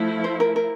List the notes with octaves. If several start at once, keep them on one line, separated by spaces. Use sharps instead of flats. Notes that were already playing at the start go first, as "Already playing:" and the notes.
Already playing: F3 A3 E4
C5
A#4
A#4